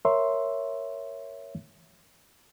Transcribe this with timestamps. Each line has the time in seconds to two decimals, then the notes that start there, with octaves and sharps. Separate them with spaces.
0.05 A#4 C#5 E5 C6